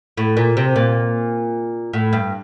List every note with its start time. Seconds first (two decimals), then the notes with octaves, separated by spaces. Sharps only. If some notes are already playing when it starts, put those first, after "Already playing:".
0.17 A2
0.37 A#2
0.57 C3
0.76 A#2
1.93 A2
2.13 G2